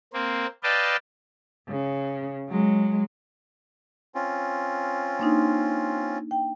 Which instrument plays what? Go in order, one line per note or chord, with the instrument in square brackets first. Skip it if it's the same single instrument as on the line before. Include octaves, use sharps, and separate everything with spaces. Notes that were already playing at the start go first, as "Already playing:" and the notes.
[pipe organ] A#3 C4
B4 D5 D#5 F5 G5 A5
[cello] C#3
F#3 G#3
[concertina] C4 C#4 F4
[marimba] A#3 D4 D#4
G5